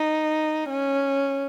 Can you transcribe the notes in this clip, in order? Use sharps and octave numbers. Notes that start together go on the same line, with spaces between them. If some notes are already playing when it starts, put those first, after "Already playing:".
Already playing: D#4
C#4